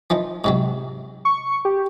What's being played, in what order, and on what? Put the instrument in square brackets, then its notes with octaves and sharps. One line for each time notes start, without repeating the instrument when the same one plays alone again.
[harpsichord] E3 F3 D#4
G#2 C3 F#3
[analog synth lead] C#6
G4